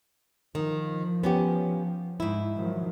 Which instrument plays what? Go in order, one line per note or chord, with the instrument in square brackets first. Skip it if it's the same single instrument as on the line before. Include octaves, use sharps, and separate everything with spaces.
[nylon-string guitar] D#3 [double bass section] F3
[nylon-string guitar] B3 C#4 G4
G#2 E4
[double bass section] D#3 F3 F#3